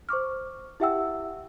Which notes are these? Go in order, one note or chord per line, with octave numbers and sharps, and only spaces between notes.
C5 C#6 D6 F6
E4 G4 E5 F#5 G5 E6